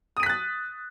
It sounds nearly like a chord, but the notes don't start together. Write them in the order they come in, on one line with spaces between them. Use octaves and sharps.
D#6 D#7 B6 F#6 A6